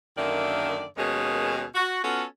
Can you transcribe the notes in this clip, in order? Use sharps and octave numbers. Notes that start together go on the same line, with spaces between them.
F#2 D3 D#3 A#3 D5 E5
D#2 B2 G#3 A#3 C#4 G#4
F#4
B3 C#4 F4 F#4 A4